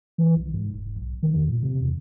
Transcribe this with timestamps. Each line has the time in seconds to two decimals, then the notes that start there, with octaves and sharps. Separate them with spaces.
0.18 E3
0.36 C2
0.54 G#2
0.74 E1
0.96 B1
1.23 D#3
1.34 E2
1.48 A#2
1.63 C3
1.81 E2